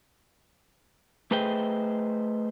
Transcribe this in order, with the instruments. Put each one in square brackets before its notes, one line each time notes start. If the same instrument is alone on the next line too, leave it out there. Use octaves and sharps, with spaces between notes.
[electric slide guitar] A3 G#4 B4 C5 D#5 G5